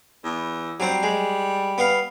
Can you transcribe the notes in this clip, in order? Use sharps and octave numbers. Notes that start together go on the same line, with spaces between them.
E2
F#3 G3 C4
G#3
B3 F5